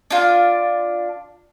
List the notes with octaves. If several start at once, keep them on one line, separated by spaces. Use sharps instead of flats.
D4 F4